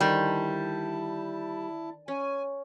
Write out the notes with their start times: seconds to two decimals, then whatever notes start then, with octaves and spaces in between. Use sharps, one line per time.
0.01 D3 D#3 G3 E4 C5 A5
2.08 C#4 G#5